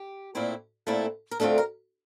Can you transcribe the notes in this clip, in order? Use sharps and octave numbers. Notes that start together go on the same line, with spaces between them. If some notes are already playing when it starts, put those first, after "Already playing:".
Already playing: G4
A#2 A3 C4 E4
A#2 A3 C4 E4
A#4
D2 D3 A3 C4 F4 A4
A#4